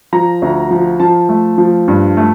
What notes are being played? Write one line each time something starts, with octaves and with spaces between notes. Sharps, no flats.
F3 A#5
D2
F3
F3 A5
A3
F3
G2
A3